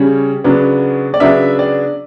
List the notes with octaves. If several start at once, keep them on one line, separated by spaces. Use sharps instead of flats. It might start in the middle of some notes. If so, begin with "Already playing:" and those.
Already playing: C#3 G3 C#4
C#3 F#3 B3 D4
D5
C#3 F#3 B3 D4 E5
D5